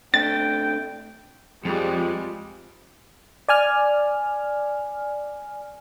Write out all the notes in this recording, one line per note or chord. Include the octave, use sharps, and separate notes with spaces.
C3 A3 D4 G5 A6
F2 G3 G#3
D5 G#5 F6